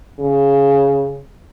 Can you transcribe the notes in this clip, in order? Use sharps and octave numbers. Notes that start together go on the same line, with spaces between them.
C#3